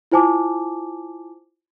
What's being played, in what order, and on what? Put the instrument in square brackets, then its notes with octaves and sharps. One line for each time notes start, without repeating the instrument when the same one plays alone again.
[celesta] E4 F4 C5 G#5 A5 D6